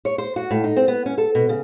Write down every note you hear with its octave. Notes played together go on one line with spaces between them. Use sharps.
C#5
C5
F#4
A2
D#4
C4
B3
C#4
A4
B2
C#3